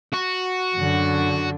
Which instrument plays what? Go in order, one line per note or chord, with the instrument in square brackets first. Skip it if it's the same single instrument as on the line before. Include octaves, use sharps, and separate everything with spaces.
[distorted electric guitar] F#4
[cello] F#2 D3